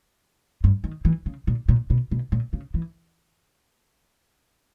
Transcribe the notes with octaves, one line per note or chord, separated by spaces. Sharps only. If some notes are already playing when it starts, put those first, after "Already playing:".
G2
D#3
E3
C#3
A#2
A#2
B2
B2
A#2
C#3
E3